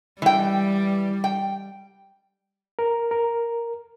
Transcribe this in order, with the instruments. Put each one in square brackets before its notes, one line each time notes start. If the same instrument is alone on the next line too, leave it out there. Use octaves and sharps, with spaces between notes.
[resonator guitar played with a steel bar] E3 G5 [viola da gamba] G3
[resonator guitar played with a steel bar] G5
[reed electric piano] A#4
A#4